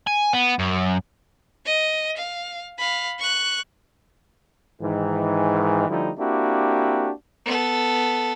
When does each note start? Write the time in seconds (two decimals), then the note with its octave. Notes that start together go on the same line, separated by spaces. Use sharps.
0.07 G#5
0.33 B3
0.59 F#2
1.66 D#5
2.17 F5
2.78 F5 B5
3.19 C#6 F#6
4.81 G#2 D#3 E3
5.88 D3 F3 G3 A3 D#4 E4
6.18 A#3 C4 D4 E4 F#4 G4
7.46 B3 A4